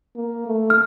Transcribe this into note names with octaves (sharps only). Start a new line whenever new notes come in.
A#3
A3
F6